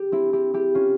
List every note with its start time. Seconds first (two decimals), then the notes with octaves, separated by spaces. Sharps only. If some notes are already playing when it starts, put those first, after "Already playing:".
Already playing: G4
0.12 C4 E4
0.33 E4 G4
0.54 E4 G4
0.74 C#4 F4